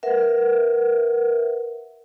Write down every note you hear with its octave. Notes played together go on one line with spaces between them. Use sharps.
A#4 B4 E5 F#5